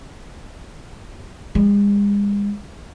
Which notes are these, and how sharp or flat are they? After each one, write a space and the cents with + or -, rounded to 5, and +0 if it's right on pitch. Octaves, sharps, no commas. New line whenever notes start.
G#3 -40